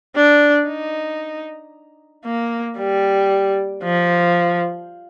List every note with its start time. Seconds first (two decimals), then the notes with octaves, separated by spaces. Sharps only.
0.16 D4
0.68 D#4
2.25 A#3
2.78 G3
3.84 F3